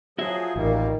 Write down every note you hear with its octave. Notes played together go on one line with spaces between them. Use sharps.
F3 F#3 F#4 G#4 E5
A1 A#2 D#3 G3 A#3